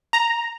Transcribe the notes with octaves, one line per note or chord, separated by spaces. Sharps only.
A#5